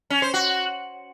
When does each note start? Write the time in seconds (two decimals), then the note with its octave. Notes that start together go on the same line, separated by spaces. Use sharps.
0.10 C#4
0.22 C5
0.34 F#4